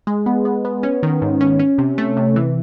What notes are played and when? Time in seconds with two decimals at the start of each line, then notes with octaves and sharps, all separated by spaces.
0.07 G#3
0.26 B3
0.45 B3
0.65 B3
0.83 C#4
1.03 D#3
1.22 G#2
1.41 C#4
1.59 C#4
1.78 C3
1.98 A3
2.17 C3
2.36 E3